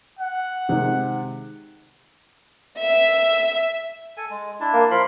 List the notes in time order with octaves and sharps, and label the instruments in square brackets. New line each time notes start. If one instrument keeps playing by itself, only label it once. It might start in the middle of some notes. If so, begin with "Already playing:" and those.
[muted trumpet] F#5
[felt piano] C3 D#3 G#3
[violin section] E5
[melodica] A4 G#5
G#3
D4 E4 A5
[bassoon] A#3
[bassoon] F3 [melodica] A#4 B5 C6